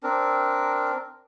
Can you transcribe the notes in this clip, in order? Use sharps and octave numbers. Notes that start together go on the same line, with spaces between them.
C4 D4 A#4